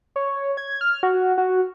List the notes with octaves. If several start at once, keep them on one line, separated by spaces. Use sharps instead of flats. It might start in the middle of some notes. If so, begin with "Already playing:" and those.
C#5
G#6
F6
F#4
F#4